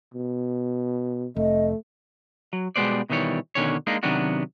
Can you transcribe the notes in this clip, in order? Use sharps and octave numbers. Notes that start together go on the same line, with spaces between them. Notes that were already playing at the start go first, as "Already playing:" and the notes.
B2
F1 A3 D#5
F#3
B2 G3 G#3 B3 C5 D5
B2 D#3 E3 G3 C#5
B2 D3 D#3 C#4 C#5
G#3 A#3 D4 D#4
C3 D#3 F#3 B3 D4 F#4